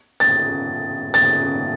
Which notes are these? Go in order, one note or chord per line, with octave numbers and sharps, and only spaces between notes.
A6
A6